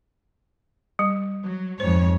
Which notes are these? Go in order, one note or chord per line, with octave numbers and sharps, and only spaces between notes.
G3
F#3
F2 G#2 C5 C#5